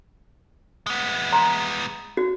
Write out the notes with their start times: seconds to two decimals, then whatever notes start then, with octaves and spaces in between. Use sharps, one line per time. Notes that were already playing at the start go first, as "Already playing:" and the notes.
0.86 G#3 B3
1.33 A#5 C6
2.17 F#4